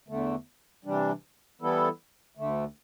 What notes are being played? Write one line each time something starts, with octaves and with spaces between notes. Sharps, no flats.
E2 D3 A3
C3 E3 G3 D4
E3 G3 B3 E4 A4
D2 D3 A3